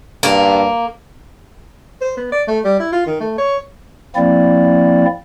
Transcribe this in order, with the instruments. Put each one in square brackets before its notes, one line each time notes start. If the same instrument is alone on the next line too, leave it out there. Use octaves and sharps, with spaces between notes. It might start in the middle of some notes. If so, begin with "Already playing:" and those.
[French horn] G2 [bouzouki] A#3
[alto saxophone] C5
B3
D5
A3
G3
E4
F4
D#3
A3
C#5
[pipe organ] F3 A#3 C4 E4 D5